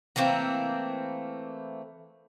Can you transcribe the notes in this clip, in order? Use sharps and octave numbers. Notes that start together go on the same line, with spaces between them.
E3 A3 A#3 C4